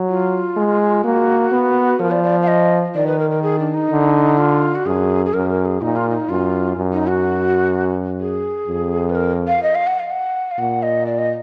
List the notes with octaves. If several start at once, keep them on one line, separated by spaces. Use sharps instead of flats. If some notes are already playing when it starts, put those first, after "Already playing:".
Already playing: F#3
F4
G#3
A#3 F#4
B3
F3 A#4
D5
D5
F5
D#5
D#3 D5
B4
A#4
A#4
G#4
D4
D#4
D3
F4
F#4
F#2 G#4
G#4
F#2 A#4
A#4
G#4
A#2 D#4
F4
D#4
F#2 F4
F#2
D#4
F#4
G#4
F2
B4
A#4
F5
D#5
F5
F#5
F5
F#5
F5
A#2 F#5
D#5
D5
D#5